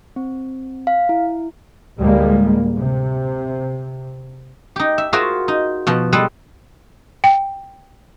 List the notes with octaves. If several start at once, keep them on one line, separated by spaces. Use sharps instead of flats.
C4
F5
E4
D2 A2 G3 G#3 A#3
C3
D#4 G4
E5
F4 F#4 G#4 A#4 C5 E5
D#4
B2 F3
G3 G#3 G#4 A4 B4
G5